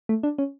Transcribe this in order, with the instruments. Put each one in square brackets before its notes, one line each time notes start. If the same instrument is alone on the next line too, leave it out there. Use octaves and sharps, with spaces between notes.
[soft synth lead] A3
D4
C#4